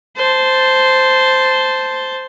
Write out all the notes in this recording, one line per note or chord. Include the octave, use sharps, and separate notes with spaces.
C5 A5